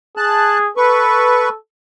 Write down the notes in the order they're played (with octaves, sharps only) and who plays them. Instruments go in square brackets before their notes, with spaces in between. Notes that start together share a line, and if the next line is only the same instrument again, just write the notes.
[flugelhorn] G#4 [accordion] A5 F#6
[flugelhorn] A4 [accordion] B4 C#6